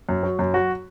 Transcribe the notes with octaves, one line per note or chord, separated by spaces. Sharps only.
F#2
F#3
F#2
F#3 F#4